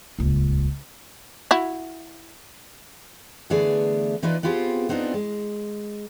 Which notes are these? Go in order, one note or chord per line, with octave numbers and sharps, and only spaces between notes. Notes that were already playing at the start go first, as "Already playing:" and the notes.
D#1 C#2
E4 F#4
D3 E3 A3 B3 G#4 D5
E3 A#3 D#4 F4 B4 D5
B3 C4 F4 G4 G#4 C5
B3 C4 D4 D#4 F4
G#3